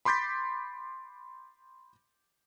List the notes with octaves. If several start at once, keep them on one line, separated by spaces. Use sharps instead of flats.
B5 C6 D6 G6 A6 B6